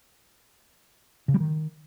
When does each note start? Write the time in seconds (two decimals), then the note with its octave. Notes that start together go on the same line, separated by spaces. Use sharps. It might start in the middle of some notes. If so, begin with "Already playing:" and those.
1.28 C#3
1.34 G3
1.40 D#3